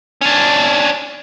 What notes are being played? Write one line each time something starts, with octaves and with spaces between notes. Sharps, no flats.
C#4 D4